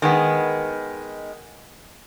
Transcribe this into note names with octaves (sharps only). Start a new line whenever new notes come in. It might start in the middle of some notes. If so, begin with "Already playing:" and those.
D#3 G#3 B3